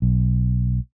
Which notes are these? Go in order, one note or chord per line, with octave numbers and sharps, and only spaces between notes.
B1